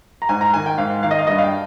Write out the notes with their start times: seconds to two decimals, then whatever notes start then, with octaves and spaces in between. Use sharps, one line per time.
0.22 A#5
0.29 G#2 G#5
0.41 A#5
0.54 D#3 A#3 G#5
0.66 G5
0.78 G#2 F5
1.03 D#3 A#3 F5
1.11 D#5
1.19 F5
1.27 G2 D#5
1.39 F5
1.44 G5